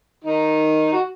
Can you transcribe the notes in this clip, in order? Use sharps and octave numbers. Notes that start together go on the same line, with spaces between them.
D#3 D#4
F#4